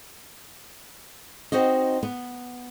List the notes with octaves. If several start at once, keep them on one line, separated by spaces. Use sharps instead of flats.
C4 D#4 F#4 D#5
B3